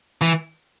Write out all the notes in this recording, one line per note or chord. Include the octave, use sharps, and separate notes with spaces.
E3